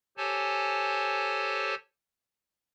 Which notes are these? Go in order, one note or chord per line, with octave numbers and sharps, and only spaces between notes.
G4 A4 C5 C#5 G#5 A5